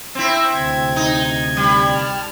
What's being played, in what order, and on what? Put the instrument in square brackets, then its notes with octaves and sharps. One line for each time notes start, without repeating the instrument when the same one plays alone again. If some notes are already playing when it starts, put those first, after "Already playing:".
[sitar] C4 E4
[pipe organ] D2 C3 G#6
[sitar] D#4
G3
[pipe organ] A5 F6